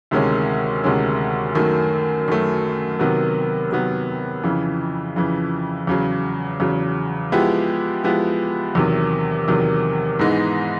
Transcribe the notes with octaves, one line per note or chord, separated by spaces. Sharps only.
D2 C3 D#3 G#3 C#4
D2 C3 D#3 G#3 C#4
F#2 D#3 F#3 A3
F#2 D#3 F#3 A3
C3 D#3 F#3 B3
C3 D#3 F#3 B3
F2 C#3 E3
F2 C#3 E3
E2 C#3 F#3
E2 C#3 F#3
F3 G#3 B3 E4 G4
F3 G#3 B3 E4 G4
E2 C3 D#3 F#3
E2 C3 D#3 F#3
G#2 E3 G#3 B3 D#4